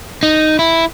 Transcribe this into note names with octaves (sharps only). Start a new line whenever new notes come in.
D#4
E4